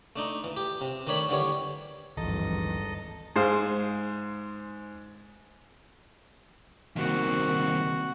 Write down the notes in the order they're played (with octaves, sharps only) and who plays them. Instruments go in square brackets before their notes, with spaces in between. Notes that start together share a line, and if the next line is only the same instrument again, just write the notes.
[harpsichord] A3 D4 D#4
E3
G4
C3
D#3 A3 D4 C#5 B5
D3 E3 G3 C#5
[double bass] G#1 G2 [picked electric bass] D2 E3 F3 [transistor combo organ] A4 D#5 A#5
[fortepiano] G#2 G#4 C5 F5 D#6
[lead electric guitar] C2 D#3 [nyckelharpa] A#3 C4 [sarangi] F#4